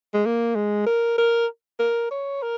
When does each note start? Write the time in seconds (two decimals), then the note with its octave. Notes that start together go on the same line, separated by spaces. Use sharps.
0.14 G#3
0.26 A#3
0.55 G#3
0.86 A#4
1.18 A#4
1.80 A#4
2.11 C#5
2.42 A#4